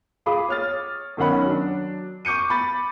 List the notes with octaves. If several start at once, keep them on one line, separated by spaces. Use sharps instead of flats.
F4 G#4 B5 D6 D#6
C#5 F6 A6
B1 D#3 C#4 F#5 B5
F#3 D4
C#6 D6 G6 C#7 D#7
B5 A6